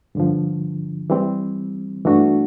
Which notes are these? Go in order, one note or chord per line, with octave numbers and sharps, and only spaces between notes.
G2 D3 F3
E3 G3 C4
G2 E3 A3 D4 F#4